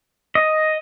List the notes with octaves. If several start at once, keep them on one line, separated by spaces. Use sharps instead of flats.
D#5